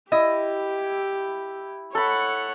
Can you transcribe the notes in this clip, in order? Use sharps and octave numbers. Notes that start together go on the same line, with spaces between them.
E4 G4 D#5
A4 C#5 F#5 B5